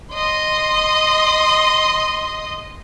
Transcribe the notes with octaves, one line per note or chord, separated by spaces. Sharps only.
D#5 C6